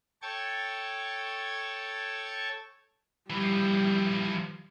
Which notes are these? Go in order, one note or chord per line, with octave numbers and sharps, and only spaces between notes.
A4 C#5 G5 A5 C#6 G#6
E3 F3 G3